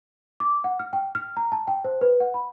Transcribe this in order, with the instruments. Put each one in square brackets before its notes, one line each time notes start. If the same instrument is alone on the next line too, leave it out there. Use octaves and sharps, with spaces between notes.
[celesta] D6
F#5
F6
G5
F6
A#5
A5
G5
C5
B4
F#5
B5